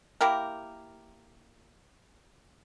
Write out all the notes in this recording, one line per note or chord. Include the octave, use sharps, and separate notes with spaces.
A#3 E4 G4 A#4